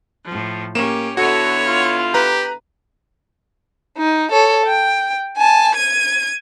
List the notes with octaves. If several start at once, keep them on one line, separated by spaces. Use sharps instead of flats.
A2 F3
A#3 C#4 G4 E7
D3 B3 E4 F#4 A4 C#5 C#7
F4
G4 B4 A#5
D#4
A4 C#5
G5
G#5 A5
G#6 D#7